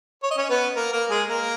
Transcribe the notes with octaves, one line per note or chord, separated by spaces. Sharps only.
C#5
D#5
C#4 C#5
B3 B4
A#3 A#4
A#3 A#4
G#3 G#4
A#3 A#4